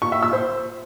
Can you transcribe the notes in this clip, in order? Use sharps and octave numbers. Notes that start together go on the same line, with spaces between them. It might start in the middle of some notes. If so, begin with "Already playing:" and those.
C#6
E5
E6
C5